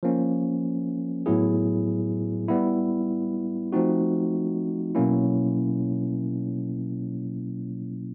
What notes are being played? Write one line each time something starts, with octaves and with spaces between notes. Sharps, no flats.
F3 A#3 C#4
A2 F#3 B3 E4 G#4
G3 B3 E4
F3 A3 C4 D#4 F#4
B2 F#3 A#3 C#4 E4